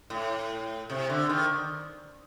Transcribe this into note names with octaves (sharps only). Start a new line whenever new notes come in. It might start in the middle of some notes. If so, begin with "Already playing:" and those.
A2
C3
D3
D#3